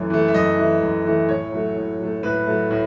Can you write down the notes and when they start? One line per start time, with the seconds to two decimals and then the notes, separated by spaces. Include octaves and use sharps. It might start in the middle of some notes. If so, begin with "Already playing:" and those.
Already playing: F#2 E3 A3 C#5
0.10 E3 A3
0.28 E5
0.34 F#2 D#5
0.58 E3 A3
0.81 F#2
1.05 E3 A3
1.29 A2 C#5
1.52 F#3 A3
1.76 A2
1.99 F#3 A3
2.23 A2 B4
2.46 F#3 A3
2.71 A2